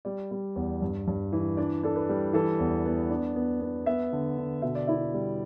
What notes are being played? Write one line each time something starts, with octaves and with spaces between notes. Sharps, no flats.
G3 D5
G3
E2
G2
G2
E3
D4 D5
D4 A4
B4
G3
E3 A4
E2
B3
D4
B3
B3
B3 E5
D3
D3
B2 E5
D5
E4 E5
G3